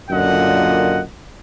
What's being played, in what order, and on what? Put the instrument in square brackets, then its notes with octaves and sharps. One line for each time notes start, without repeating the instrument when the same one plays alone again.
[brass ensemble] F#2 A#2 D3 F4 D#5 F#5